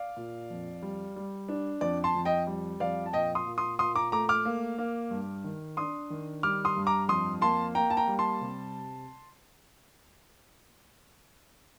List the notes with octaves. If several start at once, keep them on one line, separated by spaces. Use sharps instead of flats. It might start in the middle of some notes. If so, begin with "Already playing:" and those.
Already playing: D5 F5
A#2
F2
G3
G3
D4
F2 D5
A5 C6
F2
D#5 G5
G3
F2 D5 F5
A5
A#2 D#5 G5
C6 D#6
A#2
C6 D#6
A#2 C6 D#6
A#5 D6
A3 A#5 D6
D6 F6
A#3
A#3
G2
D#3
D4 C6 D#6
D#3
G3 D6 F6
C6 D#6
G2
A#5 D6
F2 C6 D#6
A#3 A5 C6
A#3 G5 A#5
A5
G5 A#5
G3
A5 C6
C3